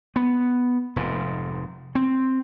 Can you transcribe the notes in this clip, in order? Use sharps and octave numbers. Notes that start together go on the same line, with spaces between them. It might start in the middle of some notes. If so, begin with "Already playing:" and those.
B3
F1 G#2
C4